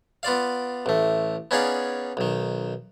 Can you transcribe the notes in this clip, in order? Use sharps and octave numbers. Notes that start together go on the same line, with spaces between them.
B3 F4 D5 F5
A1 A3
B3 C#4 D#4 G#4 D5 F5
B1 D#3